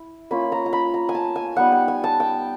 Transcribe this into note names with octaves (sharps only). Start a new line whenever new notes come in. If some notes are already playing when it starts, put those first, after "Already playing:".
Already playing: E4
A#3 C#4 F4 B5
A#5
A#5
B5
A#5
G#5
A5
G#5
G3 B3 D#4 F#5
G5
G#5
A5
G5